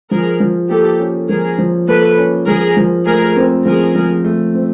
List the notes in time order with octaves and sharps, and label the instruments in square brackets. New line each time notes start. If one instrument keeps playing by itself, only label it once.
[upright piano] F3 [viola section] G#4 A#4
[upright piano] F3
[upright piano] A#3 [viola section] G4 A4
[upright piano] C#4
[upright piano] F3 [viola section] G#4 A#4
[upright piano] F3
[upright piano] A#3 [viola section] A4 B4
[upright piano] C#4
[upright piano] F3 [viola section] G#4 A#4
[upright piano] F3
[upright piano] A3 [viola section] G#4 A#4
[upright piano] C4
[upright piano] F3 [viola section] G#4 A#4
[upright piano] F3
A3
C4